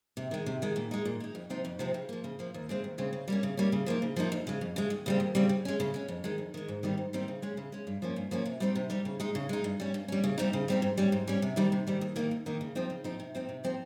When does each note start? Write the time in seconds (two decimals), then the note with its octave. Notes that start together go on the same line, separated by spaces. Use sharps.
0.17 C3
0.31 D#3 G#3
0.46 C3
0.62 D#3 G#3
0.76 A#2
0.91 G#3 D#4
1.05 A#2
1.20 G#3 D#4
1.35 F2
1.50 C3 F3 C4 D#4
1.65 F2
1.79 C3 F3 C4 D#4
1.94 C#3
2.09 F3 A#3
2.24 C#3
2.39 F3 A#3
2.54 D#2
2.69 C#3 G#3 C4
2.84 D#2
2.98 C#3 G#3 C4
3.13 C#3
3.28 G3 A#3 C#4
3.43 C#3
3.57 G3 A#3 C#4
3.72 C#3
3.86 F3 A#3 D#4
4.02 C#3
4.16 F3 A#3 D#4
4.32 F2
4.47 C#3 G#3
4.61 F2
4.76 C#3 G#3
4.90 D#2
5.06 C#3 G3 C4
5.20 D#2
5.35 C#3 G3 C4
5.49 C#3
5.65 G#3 C#4
5.80 C#3
5.94 G#3 C#4
6.08 F2
6.24 D#3 G#3
6.38 F2
6.54 D#3 G#3
6.68 G#2
6.83 D#3 G3 C4 D#4
6.97 G#2
7.13 D#3 G3 C4 D#4
7.28 C#3
7.42 G#3 C#4
7.57 C#3
7.72 G#3 C#4
7.87 G2
8.02 F3 A#3 C#4
8.16 G2
8.31 F3 A#3 C#4
8.45 C3
8.60 G3 C4 D#4
8.75 C3
8.90 G3 C4 D#4
9.05 C#3
9.20 G#3 D#4
9.35 C#3
9.49 G#3 D#4
9.64 G2
9.80 G3 C#4
9.94 G2
10.08 G3 C#4
10.24 C#3
10.38 G3 C4 D#4
10.53 C#3
10.68 G3 C4 D#4
10.82 G#2
10.98 G3 C#4
11.12 G#2
11.28 G3 C#4
11.42 C3
11.56 D#3 G3 C4 D#4
11.72 C3
11.87 D#3 G3 C4 D#4
12.01 D#2
12.16 D#3 A#3 D#4
12.31 D#2
12.46 D#3 A#3 D#4
12.61 C#3
12.75 F3 C4 D#4
12.90 C#3
13.04 F3 C4 D#4
13.20 C3
13.35 F3 C4 D#4
13.49 C3
13.64 F3 C4 D#4